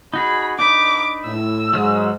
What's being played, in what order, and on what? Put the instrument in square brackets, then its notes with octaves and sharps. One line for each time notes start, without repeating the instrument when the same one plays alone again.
[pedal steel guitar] D#4 F#4 G#4 [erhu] B5
[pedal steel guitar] D4 D#4 B4 [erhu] D6
[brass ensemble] A2 [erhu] E6
[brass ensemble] G#2 [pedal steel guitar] F#3 F6